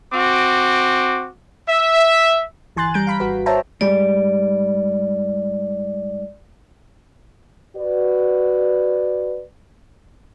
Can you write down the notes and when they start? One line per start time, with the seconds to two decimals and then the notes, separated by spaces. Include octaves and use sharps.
0.12 C4 F#4 D6
1.68 E5
2.76 G1 E3 G#5 C6 F#6 A6
2.94 G3 A#5 G6 D7
3.07 F5 B5 B6
3.20 G#1 F#4 B4
3.46 C5 C#5 E5 G5 A5 A#5
3.81 G#2 G3 D5
7.76 F#4 B4 D5